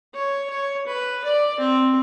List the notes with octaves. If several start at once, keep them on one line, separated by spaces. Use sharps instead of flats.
C#5
C#5
B4
D5
C4